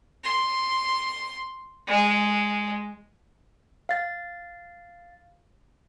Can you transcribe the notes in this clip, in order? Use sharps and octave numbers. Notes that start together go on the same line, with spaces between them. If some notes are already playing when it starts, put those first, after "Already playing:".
C6
G#3
F5 A6